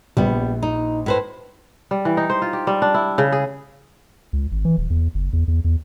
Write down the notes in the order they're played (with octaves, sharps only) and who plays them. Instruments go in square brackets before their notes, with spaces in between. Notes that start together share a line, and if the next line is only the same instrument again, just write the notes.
[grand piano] A#1 [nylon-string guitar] G3 B3
[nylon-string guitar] D#4
A2 B4 C5
[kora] G3
E3
D#4
C5
F4
G4
G3
D4
E4
C#3
G#4
[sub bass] C#2
G#1
E3
D#1
E2
F#1
E2
E2
E2